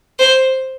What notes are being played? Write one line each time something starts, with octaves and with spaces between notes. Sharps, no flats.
C5